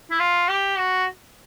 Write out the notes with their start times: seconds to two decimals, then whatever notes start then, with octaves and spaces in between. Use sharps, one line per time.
0.11 E4
0.19 F4
0.49 G4
0.78 F#4